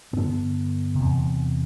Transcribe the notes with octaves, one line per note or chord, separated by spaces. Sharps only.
G2 D3 B3
C3
E2